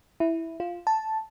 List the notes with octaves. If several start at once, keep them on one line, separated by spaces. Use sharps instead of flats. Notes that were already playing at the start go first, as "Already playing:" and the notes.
E4
F4
A5